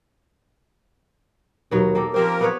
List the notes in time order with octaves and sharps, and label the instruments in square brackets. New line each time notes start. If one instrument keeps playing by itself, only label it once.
[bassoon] D#2 [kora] B2 F#3 D#4
[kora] A#3 G4 A4
[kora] F3 C4 G4 [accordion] A#3 A#4 [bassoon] C5
[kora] B3 B4 C#5